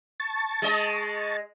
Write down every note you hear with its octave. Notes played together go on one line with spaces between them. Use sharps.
A5 C#6 A6
G#3 D#5